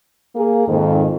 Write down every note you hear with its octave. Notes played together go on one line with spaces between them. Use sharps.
A#3 G#4
F2 G#2 D#3